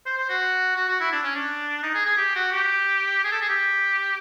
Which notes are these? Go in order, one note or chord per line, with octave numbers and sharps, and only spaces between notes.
C5
C5
F#4
F#4
F#4
E4
D4
C#4
D4
D#4
G#4
G#4
G4
F#4
G4
G#4
A4
G#4
G4